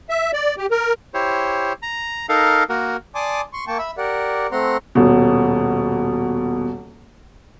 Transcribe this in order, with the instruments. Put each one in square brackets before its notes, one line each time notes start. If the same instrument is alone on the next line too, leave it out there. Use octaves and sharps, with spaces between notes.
[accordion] E5
D5
G4
A#4
[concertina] E4 G4 C5 C#5
A#5
D#4 A4 A#4 F5
A#3 F#4 A#4
[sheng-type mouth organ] D5 G#5 A5 C6 D6 D#6
C6 C#6
A#3 G5 A5 C#6
E5 B5 E6
G4 A#4 D5 F#5
A3 C4 F#5 A#5 C6
[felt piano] D#1 B2